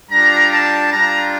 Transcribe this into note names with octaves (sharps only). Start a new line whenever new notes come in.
G3 D4 F4 A#5
A5
G3 D4 F4 A#5